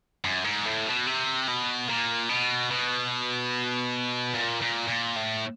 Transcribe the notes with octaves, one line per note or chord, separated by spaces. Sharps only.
F#2
G#2
A2
B2
C3
B2
A#2
B2
B2
A#2
A#2
A#2
A2